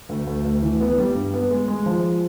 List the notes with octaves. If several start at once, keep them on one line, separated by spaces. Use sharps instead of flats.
D2
D2
D2
E3
B3
G3
G2
B3
G#3
G#3
F3